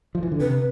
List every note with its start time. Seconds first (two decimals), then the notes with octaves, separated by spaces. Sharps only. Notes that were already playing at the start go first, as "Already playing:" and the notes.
0.15 F3
0.23 E3
0.32 D3
0.40 C3 B4